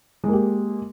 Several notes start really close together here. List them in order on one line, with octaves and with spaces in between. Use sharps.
G#3 A#3 G4